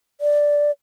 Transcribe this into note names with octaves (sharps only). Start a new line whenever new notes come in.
D5